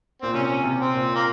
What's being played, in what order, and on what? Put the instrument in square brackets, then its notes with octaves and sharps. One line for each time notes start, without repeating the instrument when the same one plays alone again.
[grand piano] A#2 [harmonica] C4
[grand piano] C3 [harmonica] C#4
[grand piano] C3
[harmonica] C4
[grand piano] A#2
[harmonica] A#3